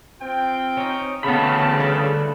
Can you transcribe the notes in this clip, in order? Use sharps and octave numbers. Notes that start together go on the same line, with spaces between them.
C4 F4 G5
C#4 D#4
D2 C#3 E3 A3 B3 G5 A5 B5
G3 A4 B4